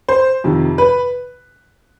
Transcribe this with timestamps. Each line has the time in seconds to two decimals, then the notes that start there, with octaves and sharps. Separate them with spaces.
0.08 C5
0.44 F2 C3 D#3
0.78 B4